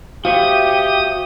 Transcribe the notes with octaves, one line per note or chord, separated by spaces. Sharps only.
F#4 G4 C5 E5 F5 D#6